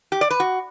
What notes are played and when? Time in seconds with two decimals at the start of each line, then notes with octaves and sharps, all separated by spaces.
0.12 G4
0.21 D5
0.30 B4
0.40 F#4